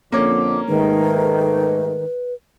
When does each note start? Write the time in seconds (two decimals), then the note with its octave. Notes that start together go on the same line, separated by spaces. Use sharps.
0.12 F2 D3 A#3 C#4 D6
0.69 G#2 D#3 A3 B4